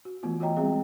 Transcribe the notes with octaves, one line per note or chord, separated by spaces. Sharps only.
F#4
E3 A3 B3 F4
F4 F#4 C#5 D#5 G5 A#5
G3 G#3 C4 G#4